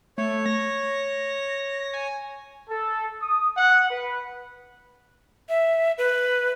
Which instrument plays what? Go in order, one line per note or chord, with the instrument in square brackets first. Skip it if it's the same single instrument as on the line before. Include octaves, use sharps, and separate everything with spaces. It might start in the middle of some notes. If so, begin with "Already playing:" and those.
[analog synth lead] A3 [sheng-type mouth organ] C#5
[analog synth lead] A#6
G#5
[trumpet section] A4
D#6
F#5
B4
[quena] E5
B4